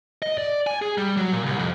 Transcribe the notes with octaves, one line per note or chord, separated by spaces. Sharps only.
D#5
D5
G#5
G#4
G3
F#3
A#2
C2
F2